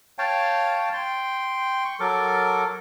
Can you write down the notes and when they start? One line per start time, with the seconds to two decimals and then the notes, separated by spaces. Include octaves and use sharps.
0.18 C#5 F5 G5 A5
0.93 G5 C6
1.85 C#6
2.00 F#3 A4 A#4 D6